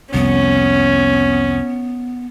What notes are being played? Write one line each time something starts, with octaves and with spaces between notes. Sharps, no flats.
C2 F2 B3 C#4